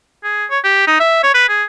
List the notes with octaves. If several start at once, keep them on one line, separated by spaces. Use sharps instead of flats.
G#4
C#5
G4
D#4
E5
C#5
B4
G#4